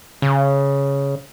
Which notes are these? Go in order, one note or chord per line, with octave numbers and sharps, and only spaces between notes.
C#3